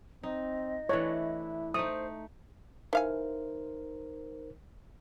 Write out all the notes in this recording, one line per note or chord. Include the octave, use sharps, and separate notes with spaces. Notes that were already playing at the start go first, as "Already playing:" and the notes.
C4 D#4 D#5
E3 A3 D4 E4 C#5
A3 D#4 C5 D#6
E3 D#4 A#4 C5 F5 G#5